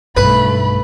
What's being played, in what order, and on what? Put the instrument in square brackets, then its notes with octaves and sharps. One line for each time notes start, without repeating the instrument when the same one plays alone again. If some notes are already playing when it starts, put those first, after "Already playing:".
[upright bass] B1 G2 [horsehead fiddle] A3 B5 [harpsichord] B4